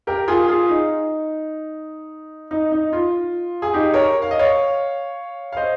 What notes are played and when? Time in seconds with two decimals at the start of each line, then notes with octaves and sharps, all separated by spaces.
0.07 G4 A#4
0.28 F4 G#4
0.48 F4 G#4
0.69 D#4
2.51 D#4
2.72 D#4
2.93 F4
3.62 G#4
3.74 D#4 G4
3.94 A#4 C#5
4.22 F5
4.31 D#5
4.39 C#5 F5
5.52 F5
5.57 C5 D#5